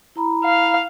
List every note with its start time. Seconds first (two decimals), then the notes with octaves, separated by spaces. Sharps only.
0.16 E4 A#5 B5
0.45 F5